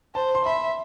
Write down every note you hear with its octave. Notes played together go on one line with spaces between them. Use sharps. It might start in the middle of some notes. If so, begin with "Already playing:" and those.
C5 A5
C6
E5 B5